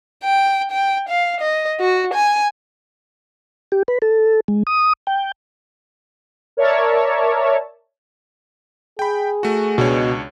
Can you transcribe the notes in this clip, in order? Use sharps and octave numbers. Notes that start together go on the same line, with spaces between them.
G5
G5
F5
D#5
F#4
G#5
G4
B4
A4
G#3
D#6
G5
A#4 C#5 D5 E5 A5
G#4 G5 B5
A3 F#4
C#2 B2 D4 C#5